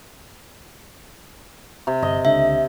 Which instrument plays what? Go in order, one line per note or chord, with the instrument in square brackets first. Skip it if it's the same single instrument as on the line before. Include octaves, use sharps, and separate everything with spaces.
[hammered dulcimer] C3
[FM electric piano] G1 [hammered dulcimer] D#5
[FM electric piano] C#2 D3 [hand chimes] E5